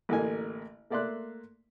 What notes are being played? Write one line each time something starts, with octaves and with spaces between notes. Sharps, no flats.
A1 D3 A#3 D#5 G#5
A3 A#3 D5 E5 C6 F#6